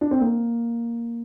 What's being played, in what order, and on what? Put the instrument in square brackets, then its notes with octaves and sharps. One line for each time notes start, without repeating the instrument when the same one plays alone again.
[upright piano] D4
C4
A#3